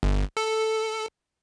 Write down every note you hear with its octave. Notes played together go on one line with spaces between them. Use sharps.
G1
A4